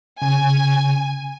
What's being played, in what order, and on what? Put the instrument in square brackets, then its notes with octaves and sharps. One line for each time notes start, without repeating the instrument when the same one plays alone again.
[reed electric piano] C#3 [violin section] G#5